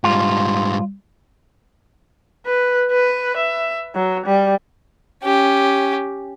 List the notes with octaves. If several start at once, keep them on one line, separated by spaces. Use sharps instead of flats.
G#2 G3 F4
B4
B4
E5
F#3
G3
C#4 G4